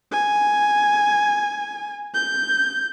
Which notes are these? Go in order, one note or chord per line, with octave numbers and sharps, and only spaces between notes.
G#5
G6